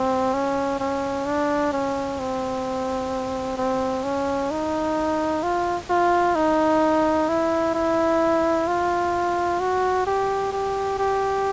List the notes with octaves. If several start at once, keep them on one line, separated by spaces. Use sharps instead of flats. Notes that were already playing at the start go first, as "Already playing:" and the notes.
Already playing: C4
C#4
C#4
D4
C#4
C4
C4
C#4
D#4
F4
F4
D#4
E4
E4
F4
F#4
G4
G4
G4